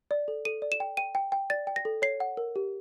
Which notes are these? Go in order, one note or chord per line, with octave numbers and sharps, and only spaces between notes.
D5
A4
A4 D#7
D5
E7
G5
G5 D#7
G5
G5
D5 A6
G5
A#6
A4
C#5 C7
F#5
A#4
G4